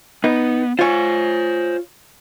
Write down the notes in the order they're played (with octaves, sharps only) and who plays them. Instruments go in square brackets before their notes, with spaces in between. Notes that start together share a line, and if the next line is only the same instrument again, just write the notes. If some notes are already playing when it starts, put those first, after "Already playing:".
[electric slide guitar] B3 [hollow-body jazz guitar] D#4 B4
[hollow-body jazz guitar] F4 C#5 [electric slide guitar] C5 G#5